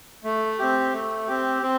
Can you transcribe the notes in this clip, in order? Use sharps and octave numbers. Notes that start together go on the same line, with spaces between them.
A3
C4 G4
A3
C4 G4
C4